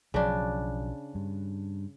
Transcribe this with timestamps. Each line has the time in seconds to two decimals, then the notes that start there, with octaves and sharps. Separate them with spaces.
0.14 B1 C#3 F3 F#3 D4
1.15 G2